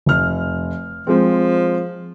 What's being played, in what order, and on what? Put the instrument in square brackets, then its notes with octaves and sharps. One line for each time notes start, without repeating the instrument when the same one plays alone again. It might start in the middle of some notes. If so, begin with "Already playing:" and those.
[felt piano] F1 F6
[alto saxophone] F3 [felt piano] G#3 C4